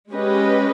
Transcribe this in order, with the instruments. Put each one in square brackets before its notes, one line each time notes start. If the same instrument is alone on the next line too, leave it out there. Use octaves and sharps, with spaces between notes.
[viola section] G#3 C#4 G4 B4 D#5